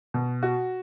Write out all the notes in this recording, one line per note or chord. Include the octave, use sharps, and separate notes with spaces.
B2
F#4